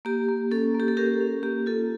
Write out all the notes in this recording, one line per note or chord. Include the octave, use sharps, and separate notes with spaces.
A#3 G4
A#3
C#4 A4
A#3
G4
A4
C#4 G4 A#4
C#4
A#3 G4
F4 A4